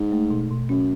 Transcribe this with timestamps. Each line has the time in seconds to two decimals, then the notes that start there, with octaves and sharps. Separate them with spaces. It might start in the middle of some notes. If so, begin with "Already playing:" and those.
Already playing: G#2
0.12 A3
0.30 B2
0.51 B2
0.69 F#2 C#4